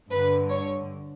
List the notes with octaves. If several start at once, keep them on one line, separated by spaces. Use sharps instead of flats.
G2 D3 B4
C#5